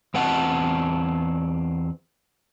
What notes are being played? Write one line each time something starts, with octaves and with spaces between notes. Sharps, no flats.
E2 C4 B4 F#5 A5